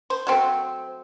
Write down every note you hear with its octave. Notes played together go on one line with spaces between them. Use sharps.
C5
F#3 A3 C4